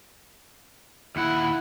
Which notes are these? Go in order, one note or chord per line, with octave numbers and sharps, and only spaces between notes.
D#2 E4 F#5